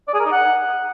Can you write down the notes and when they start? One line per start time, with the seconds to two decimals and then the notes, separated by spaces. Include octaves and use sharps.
0.08 D5
0.13 G#4
0.19 A#4
0.25 D#4
0.31 F#5